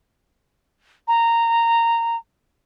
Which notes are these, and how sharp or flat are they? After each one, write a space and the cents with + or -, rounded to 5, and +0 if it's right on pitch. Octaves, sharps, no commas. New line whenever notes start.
A#5 -10